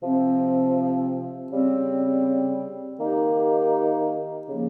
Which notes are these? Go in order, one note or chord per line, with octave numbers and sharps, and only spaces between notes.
C3 F3 C4
C#3 G3 C4
D#3 A#3 D#4 G4
C#3 F3 A#3